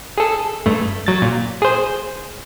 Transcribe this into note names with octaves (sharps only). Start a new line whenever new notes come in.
G#4 A4
G2 A3
F#3 A6
A#2
G#4 C5